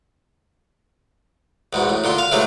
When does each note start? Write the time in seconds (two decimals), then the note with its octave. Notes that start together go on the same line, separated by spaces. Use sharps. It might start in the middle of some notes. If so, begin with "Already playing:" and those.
1.73 E2 G#2 B2
1.89 A2
2.04 A#2 D3 C6
2.18 F5
2.32 C3 E3 F#3 G#3 A3